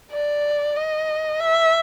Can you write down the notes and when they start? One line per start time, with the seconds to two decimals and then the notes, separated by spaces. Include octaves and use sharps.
0.12 D5
0.76 D#5
1.40 E5